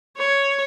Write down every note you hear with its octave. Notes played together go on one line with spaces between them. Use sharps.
C#5